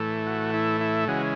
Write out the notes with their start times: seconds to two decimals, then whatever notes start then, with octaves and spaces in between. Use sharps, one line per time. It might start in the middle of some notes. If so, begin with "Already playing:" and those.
Already playing: A2 E3 A3
0.26 F#4
0.54 E4
0.81 E4
1.08 C#3 E3 G#3 F#4